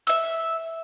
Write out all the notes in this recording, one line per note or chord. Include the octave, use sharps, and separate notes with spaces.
E5 E6